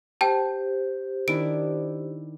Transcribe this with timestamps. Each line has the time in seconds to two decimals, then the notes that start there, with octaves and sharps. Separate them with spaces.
0.21 G4 C5 G5 A5
1.28 D#3 D4 E4 D7